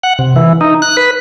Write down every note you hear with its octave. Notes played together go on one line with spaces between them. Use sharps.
F#5
C3
E3
D#4
F#6
B4